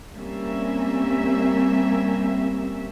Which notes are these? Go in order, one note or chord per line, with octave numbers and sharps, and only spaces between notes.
G3 A#3 C4 C#4 E5